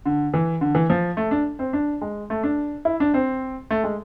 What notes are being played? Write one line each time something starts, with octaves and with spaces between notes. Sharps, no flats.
D3
E3
D3
E3
F3
A3
D4
C4
D4
G#3
A3
D4
E4
D4
C4
A3
G#3